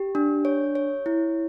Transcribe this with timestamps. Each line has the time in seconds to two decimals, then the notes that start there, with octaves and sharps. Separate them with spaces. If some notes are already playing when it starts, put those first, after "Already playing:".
Already playing: G4
0.15 D4
0.45 C#5
0.75 C#5
1.06 E4